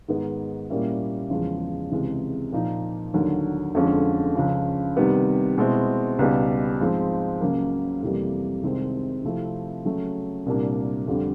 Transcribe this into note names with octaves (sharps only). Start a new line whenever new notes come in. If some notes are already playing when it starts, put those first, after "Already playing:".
G#2 D#3 G#3 B3 D#4
A#2 G3 A#3 C#4 E4
E2 C#3 F3 G#3
C#2 C3 E3 G#3
A#2 F3 A#3 D#4
D#2 D3 F#3
F2 D3 F3 G#3 C#4
C#2 C#3 F3
C3 D#3 G3 B3
B2 G#3 C4 E4
C#2 B2 G3 B3 D#4
G#2 F3 G#3 C4
C#2 C#3 F#3 A#3
F2 C3 E3 G3 A#3
C2 C3 D#3 G#3 C4
C3 F3 A3 C4 E4
C#3 F#3 A3
C2 A#2 G3 A#3 D4
F2 D3 G3